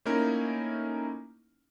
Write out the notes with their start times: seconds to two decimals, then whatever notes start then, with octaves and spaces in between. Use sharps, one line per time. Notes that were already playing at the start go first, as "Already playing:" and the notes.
0.05 A3 A#3 C#4 D#4 E4 A#4